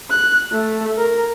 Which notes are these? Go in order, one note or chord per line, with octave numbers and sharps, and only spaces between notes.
F#6
A3
A#4